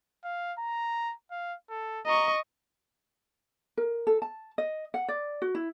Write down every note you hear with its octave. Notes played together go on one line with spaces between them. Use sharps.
F5
A#5
F5
A4
D#5 A#5 C#6
A#4
A4
A5
D#5
F#5
D5
F#4
E4